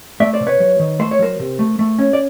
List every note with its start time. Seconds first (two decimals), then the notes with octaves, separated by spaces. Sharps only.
0.20 A3 D5 E5
0.33 C5 D5
0.41 C3
0.47 B4 C#5
0.60 F#3
0.79 D#3
0.99 A3 C5
1.11 C#5
1.19 F#3 A#4 C5
1.39 C3
1.59 A3
1.79 A3
1.99 C#4
2.13 D5